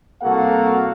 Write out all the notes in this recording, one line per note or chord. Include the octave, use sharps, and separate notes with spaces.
C2 A#3 F#4 A4 F5 F#5